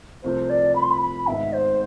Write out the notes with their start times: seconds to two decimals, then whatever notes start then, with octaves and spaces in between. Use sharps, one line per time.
0.24 C2 C3 F3 A3 C4 C5
0.50 D5
0.76 B5
0.83 C6
0.90 B5
1.01 B5
1.27 G#1 G#2 G#3 B3 E5
1.53 C5